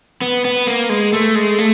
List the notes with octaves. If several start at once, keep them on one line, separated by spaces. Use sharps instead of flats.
B3
B3
A#3
G#3
A3
G#3
A3